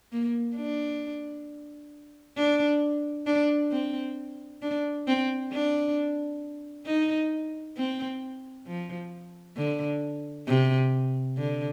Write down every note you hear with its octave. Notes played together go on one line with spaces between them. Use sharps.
A#3
D4
D4
D4
C4
D4
C4
D4
D#4
C4
F3
D3
C3
D3